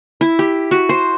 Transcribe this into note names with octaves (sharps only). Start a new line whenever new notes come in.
E4
G4
F#4
C5